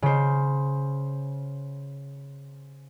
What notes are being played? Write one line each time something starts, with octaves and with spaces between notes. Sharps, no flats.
C#3 C5